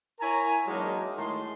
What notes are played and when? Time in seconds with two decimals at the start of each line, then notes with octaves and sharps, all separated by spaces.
0.20 E4 A#4 C#5 G#5 A#5
0.67 E3 F#3 G#3 A#3 D4 D#4
1.17 A2 D#3 G#3 C6